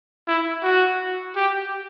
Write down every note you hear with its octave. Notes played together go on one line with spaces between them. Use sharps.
E4
F#4
G4